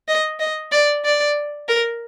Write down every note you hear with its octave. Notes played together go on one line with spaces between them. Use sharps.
D#5
D#5
D5
D5
A#4